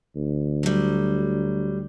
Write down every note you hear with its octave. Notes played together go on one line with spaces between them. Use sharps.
D2
F#3 G3